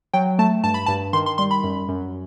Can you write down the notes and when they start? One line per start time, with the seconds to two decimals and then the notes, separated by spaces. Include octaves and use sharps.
0.14 F#3 G5
0.39 A3 A5
0.63 G2 A5
0.74 B5
0.86 G2 A5
1.13 D#3 C6
1.26 C6
1.38 G3 C6
1.51 B5
1.64 F#2
1.89 F#2